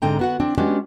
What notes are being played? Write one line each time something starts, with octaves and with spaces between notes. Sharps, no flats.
G#2 D3 C4 G5 A#5
B3 F#4 F#5
C4 D4
G#3 B3 C#4 D4 F#4 G4